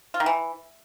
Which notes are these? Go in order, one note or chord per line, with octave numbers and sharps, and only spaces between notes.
F4
D#3
E3